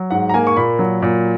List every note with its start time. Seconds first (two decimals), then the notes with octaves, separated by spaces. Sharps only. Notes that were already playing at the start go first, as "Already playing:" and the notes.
Already playing: F#3
0.11 G#2 F#5
0.29 A#5
0.34 A#3 G#5
0.47 C#6
0.57 A#2 B5
0.79 F#3
1.02 A#2